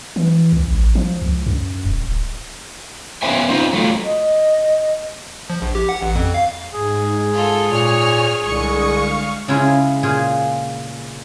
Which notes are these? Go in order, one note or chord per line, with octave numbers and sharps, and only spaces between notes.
E3
C#2
A1
F3
C#2
F#2
D#1
D1
B3 C#4 C5 E5 G#5
C4 D#4 F4 C5
F#3 A3 F4
D#5
F3
A#1
G4
F#5
A1
F2
F5
G#2 G#4
F4 A4
A#2 C#5 G#5 F6
C2 D3 G#3 C#6 D#6
F5
C#3 G#3 C#4 E4 F4 G#4
A#2 F4 G#4